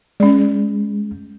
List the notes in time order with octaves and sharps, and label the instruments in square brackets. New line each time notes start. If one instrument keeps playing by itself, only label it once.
[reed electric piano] G#3 [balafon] C#4 D5